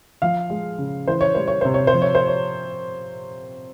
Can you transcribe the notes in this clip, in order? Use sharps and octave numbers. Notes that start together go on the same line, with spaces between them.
F3 F5
G#3
C#3
E3 C5
C#5
G3 C5
C#5
C3 C5
C#5
C5
F3
C#5
C5
C#5